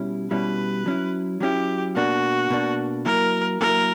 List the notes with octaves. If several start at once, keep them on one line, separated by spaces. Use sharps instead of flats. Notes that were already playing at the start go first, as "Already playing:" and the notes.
Already playing: B2 G3 C#4 E4
B2 G3 C#4 E4 B4
F#3 C#4 E4
F#3 C#4 E4 G4
B2 A#3 D4 F#4
B2 A#3 D4
F#3 A#3 E4 A#4
F#3 A#3 E4 A#4